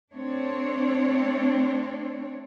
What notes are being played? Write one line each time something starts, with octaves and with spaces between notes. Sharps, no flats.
A3 C4 D4 C#5